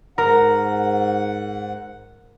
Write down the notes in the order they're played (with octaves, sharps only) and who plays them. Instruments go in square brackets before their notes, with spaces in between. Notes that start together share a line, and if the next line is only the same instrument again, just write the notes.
[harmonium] G#2 F#5 [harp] A#4